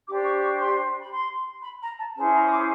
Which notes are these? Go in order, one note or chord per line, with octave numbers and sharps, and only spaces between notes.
D4 G4 C5 D6
C#6
C#6
C6
B5
C6
B5
A#5
A5
C#4 E4 G#4 C5 A5
A#5
D#6
D6